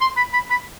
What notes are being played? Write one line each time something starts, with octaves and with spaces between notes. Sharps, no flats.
C6
B5
B5
B5